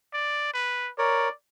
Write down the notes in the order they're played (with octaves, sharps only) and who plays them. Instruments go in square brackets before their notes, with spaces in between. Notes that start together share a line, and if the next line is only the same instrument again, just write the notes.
[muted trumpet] D5
B4
[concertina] A#4 C#5 [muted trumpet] D5